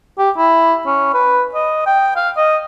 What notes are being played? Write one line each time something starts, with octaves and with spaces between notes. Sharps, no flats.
G4
E4
C#4
B4
D#5
G5
F5
D#5